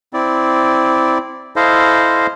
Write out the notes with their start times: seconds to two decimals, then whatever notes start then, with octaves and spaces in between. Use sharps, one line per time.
0.13 C4 E4 D5
1.56 E4 A4 C5 D#5 F5